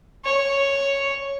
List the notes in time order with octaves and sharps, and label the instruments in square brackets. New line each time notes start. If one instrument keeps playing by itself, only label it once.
[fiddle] C#5